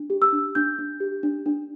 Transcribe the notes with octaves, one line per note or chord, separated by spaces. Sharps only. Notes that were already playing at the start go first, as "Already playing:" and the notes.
Already playing: D4
G4
E6
D4
D4 G6
D4
G4
D4
D4